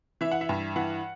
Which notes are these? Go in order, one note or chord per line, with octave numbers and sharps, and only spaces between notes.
E3 E5
F#5
E5
G2
E3 F#5